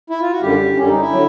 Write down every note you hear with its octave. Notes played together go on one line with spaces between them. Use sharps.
E4
F4
F#4
F#2 D3 G3 G4
F#2 D3 G3 C#4
D#4
E4
D3 F#3